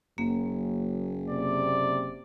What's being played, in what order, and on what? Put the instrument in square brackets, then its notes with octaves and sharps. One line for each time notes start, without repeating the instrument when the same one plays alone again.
[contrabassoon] F#1 [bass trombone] F#2 [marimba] A#3
[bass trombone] C3 [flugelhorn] D5